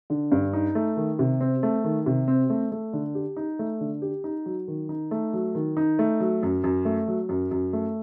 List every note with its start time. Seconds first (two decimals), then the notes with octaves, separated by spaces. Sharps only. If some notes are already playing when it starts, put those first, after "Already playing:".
0.10 D3
0.32 G2
0.53 D#4
0.75 A3
0.97 D#3
1.19 C3
1.41 C4
1.63 A3
1.84 D#3
2.06 C3
2.28 C4
2.50 A3
2.72 A3
2.93 D3
3.15 G4
3.37 D#4
3.59 A3
3.81 D3
4.02 G4
4.24 D#4
4.46 F#3
4.68 D#3
4.89 D#4
5.11 A3
5.33 F#3
5.55 D#3
5.77 D#4
5.99 A3
6.20 F#3
6.43 F#2
6.64 F#2
6.85 A3
7.08 F#3
7.29 F#2
7.51 F#2
7.73 A3